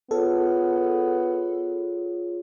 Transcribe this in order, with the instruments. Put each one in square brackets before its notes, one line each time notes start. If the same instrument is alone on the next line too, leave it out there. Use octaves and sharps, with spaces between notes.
[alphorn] B3 [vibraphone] F4 G#4 C#5 [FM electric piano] A4